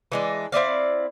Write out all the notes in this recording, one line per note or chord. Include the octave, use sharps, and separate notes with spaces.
E3 G#3 D4
C4 E4 D5 F5